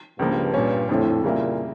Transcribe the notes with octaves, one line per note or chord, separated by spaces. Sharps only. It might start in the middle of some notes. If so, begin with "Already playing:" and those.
C#2 G2 C#3 F3 A#3
A#2 G3 C#4
F2 A2 D3 F3 A3
A#2 C#3 G3 A#3 E4